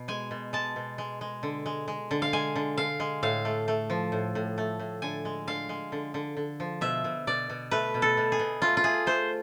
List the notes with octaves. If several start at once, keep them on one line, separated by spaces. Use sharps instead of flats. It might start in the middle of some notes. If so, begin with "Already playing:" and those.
Already playing: B2
G#3 G#5
B2
G#3 A5
B2
G#3
G#3
D3
G#3
G#3
D3
F5
G#3 G#5
D3
D3 F5
G#3
A2 F5
A3
A3
F3
A2
A2
A3
A2
D3 G#5
G#3
D3 F5
G#3
D3
D3
D3
F3
B2 E5
B2
B2 D5
B2
A3 B4
B2
A4
B2
G#4
B2
A3 F4
F4
A3 G#4
A3 C5